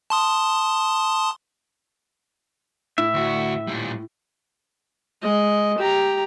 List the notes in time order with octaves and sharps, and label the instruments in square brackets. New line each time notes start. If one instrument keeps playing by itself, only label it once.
[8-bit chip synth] A5 C6 D#6
[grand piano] A2 [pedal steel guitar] E5
[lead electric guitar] D2 F#4
A#2 G3
[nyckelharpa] G#3 D#5
G4 A#5